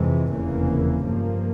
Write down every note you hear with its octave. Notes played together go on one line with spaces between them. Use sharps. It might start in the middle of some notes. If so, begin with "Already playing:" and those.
Already playing: F2 C3 E3 G#3
F1 E2 C#3 E3 A#3
G2 F3 A#3